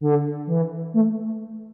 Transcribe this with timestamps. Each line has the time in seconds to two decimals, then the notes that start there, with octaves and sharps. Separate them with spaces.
0.01 D3
0.47 E3
0.94 A3